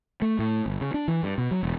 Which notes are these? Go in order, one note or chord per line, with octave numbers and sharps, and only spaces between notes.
A3
A2
G1
C#3
D4
E3
G2
B2
F#3
E1